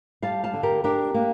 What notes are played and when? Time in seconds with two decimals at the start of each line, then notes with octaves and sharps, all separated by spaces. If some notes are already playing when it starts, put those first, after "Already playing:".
0.22 G3 F5 A5
0.44 F5 A5
0.54 D3
0.63 G4 A#4
0.84 D4 G4 A#4
1.14 A#3